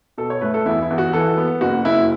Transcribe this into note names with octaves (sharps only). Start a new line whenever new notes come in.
B2 A4
C#5
A3 B4
A4
E2 E4
E4
E2
F#4
E3 A4
B3
F#1 F#4
F#1 E4